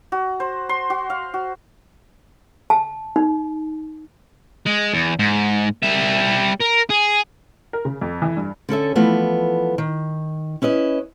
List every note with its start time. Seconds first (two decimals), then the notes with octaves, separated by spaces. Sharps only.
0.12 F#4
0.40 C5
0.69 C6
0.90 F#4
1.10 F5
1.34 F#4
2.70 A5
3.16 D#4
4.67 G#3
4.94 E2
5.19 G#2
5.83 G3 E5
6.60 A#4
6.90 G#4
7.73 A#4
7.85 C#3
8.01 F2
8.22 E3
8.37 G2
8.69 D3 C#4 A4 E5
8.96 E3 F3 A3 B3
9.78 D#3
10.62 C#4 E4 B4 D#5